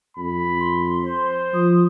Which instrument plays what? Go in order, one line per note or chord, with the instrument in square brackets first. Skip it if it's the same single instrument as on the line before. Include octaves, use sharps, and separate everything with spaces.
[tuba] F2 [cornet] B5
[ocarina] C6
[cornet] C5
[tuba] F3 [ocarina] D#6